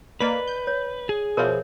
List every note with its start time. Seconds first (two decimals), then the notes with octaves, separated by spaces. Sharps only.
0.21 A#3 B4 D5 D#5 B6
0.47 G6
0.67 C#5
1.09 G#4
1.37 B2 F3 A#4 C#5 E5